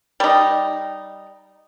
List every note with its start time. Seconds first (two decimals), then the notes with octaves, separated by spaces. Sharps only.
0.20 G3 D#4